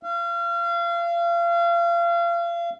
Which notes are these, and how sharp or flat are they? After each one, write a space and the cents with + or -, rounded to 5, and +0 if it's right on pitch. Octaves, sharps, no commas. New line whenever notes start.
F5 -35